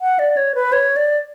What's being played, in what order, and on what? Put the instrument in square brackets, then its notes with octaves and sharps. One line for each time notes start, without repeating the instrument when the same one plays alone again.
[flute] F#5
D5
C#5
B4
C#5
D5